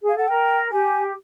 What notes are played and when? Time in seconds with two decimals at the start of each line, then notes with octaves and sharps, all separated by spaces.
0.02 G#4
0.09 F5
0.15 A4 F#5
0.28 A#4 G5
0.71 G4 G#5